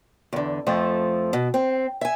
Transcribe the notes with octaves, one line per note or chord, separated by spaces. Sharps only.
E2 D3
F2 F3 A3
B2
C4
E5 G#5